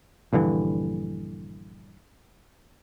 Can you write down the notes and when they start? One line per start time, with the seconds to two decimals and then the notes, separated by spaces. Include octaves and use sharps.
0.33 A#1 G2 D3 E3